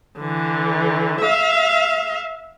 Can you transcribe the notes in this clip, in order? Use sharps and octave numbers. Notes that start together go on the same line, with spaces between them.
D3 E3
E5 F5